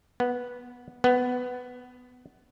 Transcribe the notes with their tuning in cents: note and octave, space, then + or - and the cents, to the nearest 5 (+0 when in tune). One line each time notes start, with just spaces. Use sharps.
B3 -10
B3 +10